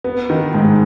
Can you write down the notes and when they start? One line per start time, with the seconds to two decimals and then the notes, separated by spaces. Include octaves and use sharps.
0.04 B3
0.30 D#3
0.54 G#2